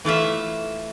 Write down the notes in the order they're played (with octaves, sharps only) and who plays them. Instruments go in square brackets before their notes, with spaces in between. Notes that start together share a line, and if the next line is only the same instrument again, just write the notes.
[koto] E3 A3 F4 E5